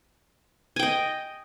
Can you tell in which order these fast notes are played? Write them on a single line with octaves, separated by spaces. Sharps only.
G#5 G5 D#5